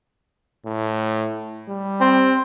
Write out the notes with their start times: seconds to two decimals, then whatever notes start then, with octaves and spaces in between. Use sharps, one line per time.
0.66 A2
1.68 G3
2.01 C4